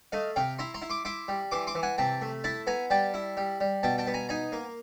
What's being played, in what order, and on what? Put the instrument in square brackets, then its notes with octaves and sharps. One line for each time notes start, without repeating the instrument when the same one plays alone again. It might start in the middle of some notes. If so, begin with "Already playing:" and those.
[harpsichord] A3 D#5 F5
C3 F5 G5
E4 A#5 C6
A#5 C6
E4
C6 D6
E4 C6 D6
G3
E3 C6 D6
C6 D6
E3
F#5 G#5
C3 G5 A5
A3
E4 A5 B5
B3 G#5 A#5
G3 G5 A5
E4
G3
G3
B2 G5 A5
G5 A5
B3
G#5 A#5
D#4 G#5 A#5
A#3